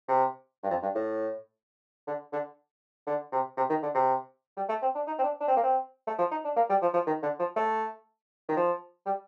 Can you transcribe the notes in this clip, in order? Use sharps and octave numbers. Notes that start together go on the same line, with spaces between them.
C3
G2
F2
G2
A2
D3
D3
D3
C3
C3
D#3
D3
C3
G3
A3
C4
D4
D#4
C4
D4
D4
C4
A#3
C4
A3
F3
D#4
D4
A#3
G3
F3
F3
D#3
D3
F3
A3
D#3
F3
G3